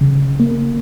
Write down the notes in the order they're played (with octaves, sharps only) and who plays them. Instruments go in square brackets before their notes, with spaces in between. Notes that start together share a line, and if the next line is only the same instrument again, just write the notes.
[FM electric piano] C#3
A#3